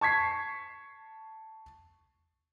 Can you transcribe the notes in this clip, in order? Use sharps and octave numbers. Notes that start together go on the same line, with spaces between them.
A5 C#6 G#6 B6 C7